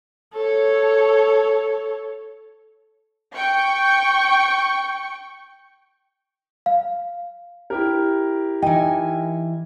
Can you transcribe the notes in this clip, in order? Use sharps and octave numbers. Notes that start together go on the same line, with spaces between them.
A4 C#5
G5 C#6
F5
E4 G4 A#4
E3 D#4 G5 G#5